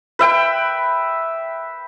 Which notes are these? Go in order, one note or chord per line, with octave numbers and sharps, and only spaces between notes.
B4 E5 G5